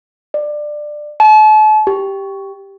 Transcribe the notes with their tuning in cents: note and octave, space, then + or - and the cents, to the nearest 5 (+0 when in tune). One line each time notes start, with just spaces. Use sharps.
D5 +20
A5 -40
G4 +0